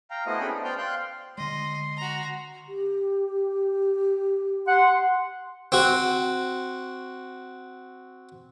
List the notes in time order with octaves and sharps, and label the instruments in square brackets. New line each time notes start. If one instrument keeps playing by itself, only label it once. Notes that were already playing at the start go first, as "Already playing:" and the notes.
[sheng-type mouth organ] F5 G5 A#5
A3 B3 E4 F#4 C5 D#5
C#4 D4 G#4 A4 G5 B5
B3
C5 D5 G5 F6 G6
F5 G5 C6 F#6 G6
[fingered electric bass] D3 G#3 [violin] D#5 [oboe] C6
[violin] F#4 A#5
[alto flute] G4
[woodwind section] F#5 C6
[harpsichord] C4 F#4